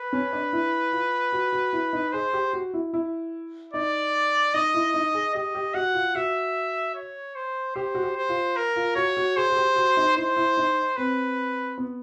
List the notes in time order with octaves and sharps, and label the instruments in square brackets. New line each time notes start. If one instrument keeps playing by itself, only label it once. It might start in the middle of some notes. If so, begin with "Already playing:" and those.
Already playing: [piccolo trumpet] B4
[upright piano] C#4
D4
E4
F4
F#4
F#4
E4
D#4
[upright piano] G#4 [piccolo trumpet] C5
[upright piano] G4
F#4
E4
E4
[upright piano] D#4 [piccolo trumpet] D5
[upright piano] D#4 [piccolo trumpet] D#5
[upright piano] E4
D#4
G#4
[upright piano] G4 [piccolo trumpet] D#5
[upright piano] G4
[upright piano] F#4 [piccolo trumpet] F#5
[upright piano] F4
[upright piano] F#4 [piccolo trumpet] E5
[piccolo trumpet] C#5
C5
[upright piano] G4 [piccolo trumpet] C5
[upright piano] F#4
G4
[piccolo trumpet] C5
[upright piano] F4
[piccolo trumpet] A#4
[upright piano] F4
[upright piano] F#4 [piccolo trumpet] C#5
[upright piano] F#4
[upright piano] G#4 [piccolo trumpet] C5
[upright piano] F#4
G4
F#4
D#4
[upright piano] E4 [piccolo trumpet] C5
[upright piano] E4
D#4
[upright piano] C4 [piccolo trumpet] B4
[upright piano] B3